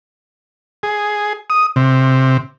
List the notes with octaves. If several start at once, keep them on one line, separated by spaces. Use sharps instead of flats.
G#4
D#6
C3